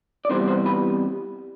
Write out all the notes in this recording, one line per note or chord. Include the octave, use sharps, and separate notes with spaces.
D5
C2 C3 E3 G3 B3 C5
C5
B4